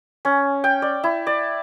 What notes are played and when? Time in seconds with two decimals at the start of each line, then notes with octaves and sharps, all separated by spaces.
0.25 C#4
0.64 G5
0.82 D5
1.04 E4
1.27 D5